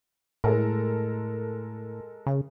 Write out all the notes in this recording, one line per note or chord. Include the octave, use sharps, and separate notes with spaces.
A2 G#3 A4 A#4
C#3